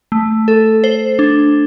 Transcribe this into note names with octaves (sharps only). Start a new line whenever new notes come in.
A3
A4
C5
D4